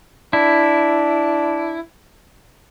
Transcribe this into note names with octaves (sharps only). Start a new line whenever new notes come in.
D4 E4